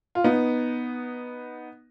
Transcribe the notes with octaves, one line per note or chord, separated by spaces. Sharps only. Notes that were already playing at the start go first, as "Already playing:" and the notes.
F4
B3 D#4